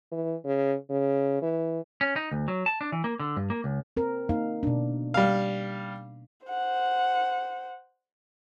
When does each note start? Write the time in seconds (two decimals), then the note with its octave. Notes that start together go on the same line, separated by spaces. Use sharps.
0.12 E3
0.45 C#3
0.90 C#3
1.42 E3
2.01 C#4
2.16 D#4
2.31 D2
2.48 F#3
2.66 A5
2.81 D4
2.92 E3
3.04 A#3
3.20 D3
3.37 G2
3.50 A#3
3.64 C#2
3.97 C4 A#4
4.29 A#3 D#4 F5
4.63 B2 D4
5.14 G3 F5
6.47 C5 F#5